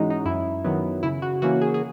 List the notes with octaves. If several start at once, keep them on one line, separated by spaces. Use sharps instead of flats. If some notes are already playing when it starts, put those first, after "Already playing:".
Already playing: G#2 E3 G#3 C#4 D#4 F#4
D#4
F#2 E4
D#3 F#3 B3
C#3 E4
F#4
E3 A#3 C#4 F#4
G#4
G#4